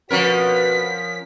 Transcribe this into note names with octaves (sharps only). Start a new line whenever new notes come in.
B2 F3 C#4 F#4 A#4 B4 B6